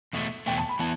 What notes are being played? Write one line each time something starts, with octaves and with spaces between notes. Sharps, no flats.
E2 B2 A3
E2 B2 A3 G5
A5
B5
E3 B3 A5